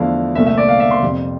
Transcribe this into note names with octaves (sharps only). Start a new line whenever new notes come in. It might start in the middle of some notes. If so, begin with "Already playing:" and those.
Already playing: E2 D3 F3 A3 E4 F5
C2 A#2 A3 E5
E5
D5
F5
E5
C6
F2 C3 G3